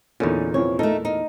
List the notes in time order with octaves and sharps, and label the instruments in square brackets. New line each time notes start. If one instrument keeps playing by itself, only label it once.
[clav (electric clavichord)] E2 A#2 [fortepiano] D3 D#4 [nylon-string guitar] C#4
[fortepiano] C3 E3 F3 [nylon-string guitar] C#5
[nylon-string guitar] A3 D#4 [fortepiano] A4 A#4 A5
[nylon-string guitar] D#4